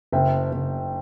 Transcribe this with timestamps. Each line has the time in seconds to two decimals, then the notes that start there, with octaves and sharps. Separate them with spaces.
0.12 F#1 E5 G5
0.52 F#1